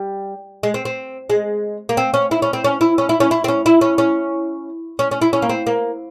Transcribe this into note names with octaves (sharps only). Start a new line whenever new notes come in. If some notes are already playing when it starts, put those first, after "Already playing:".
Already playing: G3
G#3
C4
C4
G#3
A#3
C4
C#4
E4
C#4
C4
C#4
E4
C#4
E4
C#4
E4
C4
C#4
E4
C#4
C#4
C#4
C#4
E4
C#4
A#3
C4
A#3